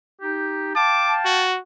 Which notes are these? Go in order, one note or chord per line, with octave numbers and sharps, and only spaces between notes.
D#4 G4
F5 G5 A5 D6
F#4